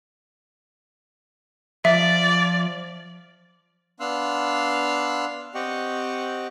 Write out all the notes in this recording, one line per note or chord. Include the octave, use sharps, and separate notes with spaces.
F3 D5 E5
B3 D4 F5 C6 E6 F#6
C4 G4 D#5 F#5 G5 C#6